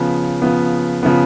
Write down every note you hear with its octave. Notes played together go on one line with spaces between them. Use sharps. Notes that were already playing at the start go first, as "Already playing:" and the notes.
Already playing: C#3 F3 B3
C#3 F3 B3
C#3 F3 B3